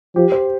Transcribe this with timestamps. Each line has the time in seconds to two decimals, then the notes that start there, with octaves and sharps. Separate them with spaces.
0.16 F3 G4
0.32 C5